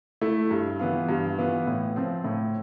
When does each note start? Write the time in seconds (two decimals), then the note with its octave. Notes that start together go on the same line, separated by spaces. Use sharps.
0.21 A3 E4
0.51 G2
0.79 E3 B3 F4
1.09 G2
1.38 E3 B3 F4
1.67 A2
1.96 F3 C4 F4
2.24 A2